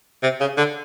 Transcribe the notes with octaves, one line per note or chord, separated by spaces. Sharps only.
C3
C#3
D3